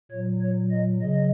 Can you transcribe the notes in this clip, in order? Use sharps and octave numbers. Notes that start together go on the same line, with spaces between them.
A#2 F#3 C#5
C#5
D#5
C#3 F#3 D#5